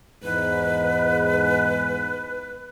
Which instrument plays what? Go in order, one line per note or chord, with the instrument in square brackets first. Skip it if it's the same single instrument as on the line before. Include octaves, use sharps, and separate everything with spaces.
[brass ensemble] E2 G#2 [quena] B4